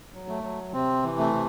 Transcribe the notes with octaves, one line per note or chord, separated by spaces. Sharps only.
F#3
A3
F#3
C3 C4
E3
A3
C3